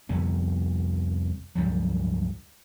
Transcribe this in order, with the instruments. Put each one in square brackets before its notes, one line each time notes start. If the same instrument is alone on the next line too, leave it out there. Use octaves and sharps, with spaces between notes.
[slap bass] C2 F2 D3 B3
C#2 G2 F3 F#3